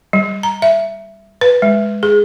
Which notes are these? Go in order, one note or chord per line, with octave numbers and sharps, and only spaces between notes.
G3
A#5
E5
B4
G#3
G#4